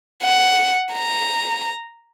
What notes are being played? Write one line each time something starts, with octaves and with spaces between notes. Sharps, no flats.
F#5
A#5